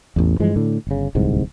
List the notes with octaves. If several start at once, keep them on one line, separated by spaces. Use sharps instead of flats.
A1 E2
G2 E3 F3 G#3
A2 D3
G1 C#3
D1 C2 G#2